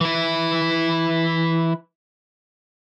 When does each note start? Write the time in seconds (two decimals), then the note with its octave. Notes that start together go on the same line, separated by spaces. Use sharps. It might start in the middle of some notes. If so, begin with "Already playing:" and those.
0.01 E3 E4